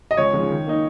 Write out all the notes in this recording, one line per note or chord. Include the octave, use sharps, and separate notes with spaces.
D#5
C#2 C#5
C#3 F3 G#3
D#3
A#3 D#4